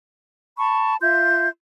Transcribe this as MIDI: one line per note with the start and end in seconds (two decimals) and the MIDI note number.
0.58 0.95 81
0.58 0.95 83
0.58 0.95 85
1.01 1.49 65
1.01 1.49 76
1.01 1.49 84
1.01 1.49 91